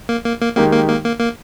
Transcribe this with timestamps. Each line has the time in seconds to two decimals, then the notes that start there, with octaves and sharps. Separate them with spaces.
0.09 A#3
0.25 A#3
0.41 A#3
0.56 D#3 G#3 A#3 D#4 G4
0.72 A#3
0.89 A#3
1.04 A#3
1.20 A#3